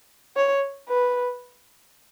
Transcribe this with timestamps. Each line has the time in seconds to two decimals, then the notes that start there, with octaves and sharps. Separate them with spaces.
0.36 C#5
0.88 B4